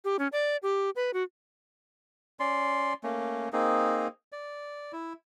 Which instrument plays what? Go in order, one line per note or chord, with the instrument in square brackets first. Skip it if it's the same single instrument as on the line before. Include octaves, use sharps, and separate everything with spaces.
[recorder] G4
C#4
D5
G4
B4
F#4
[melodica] C#4 D5 C6
A3 A#3 C#4
A#3 C4 D#4 G#4
D5
E4